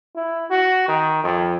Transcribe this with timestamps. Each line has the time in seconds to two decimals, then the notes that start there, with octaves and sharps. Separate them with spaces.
0.16 E4
0.50 F#4
0.88 D#3
1.24 F2